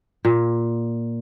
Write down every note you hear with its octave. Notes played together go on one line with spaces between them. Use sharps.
A#2